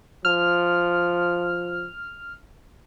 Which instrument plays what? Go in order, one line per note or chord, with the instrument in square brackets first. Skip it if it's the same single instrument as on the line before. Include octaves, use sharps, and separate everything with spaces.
[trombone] F3 [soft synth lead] F6